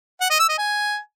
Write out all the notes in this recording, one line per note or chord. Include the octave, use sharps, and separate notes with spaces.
F#5
D#5
E6
D#5
G#5